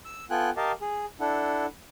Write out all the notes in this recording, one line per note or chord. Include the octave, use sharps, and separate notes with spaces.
E6
B3 F4 A4 G5 G#5 F#6
G4 A#4 D#5 F5 A5
G#4
D4 E4 A4 F#5